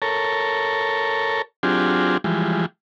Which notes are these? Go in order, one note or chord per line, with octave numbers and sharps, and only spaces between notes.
A4 A#4 C#5
F#3 C4 D4 F4 G4 G#4
E3 F3 G3 G#3